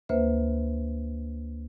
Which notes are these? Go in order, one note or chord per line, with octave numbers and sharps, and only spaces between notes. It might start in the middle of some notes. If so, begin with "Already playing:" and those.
D2 A#3 B4 C5 E5